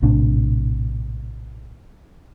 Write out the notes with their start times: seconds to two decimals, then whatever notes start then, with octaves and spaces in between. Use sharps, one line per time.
0.02 A#1 A2 C3 D4